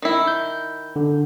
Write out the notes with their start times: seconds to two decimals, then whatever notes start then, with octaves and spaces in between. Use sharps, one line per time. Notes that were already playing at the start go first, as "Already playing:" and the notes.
0.02 D#3 E4
0.28 G6
0.96 D3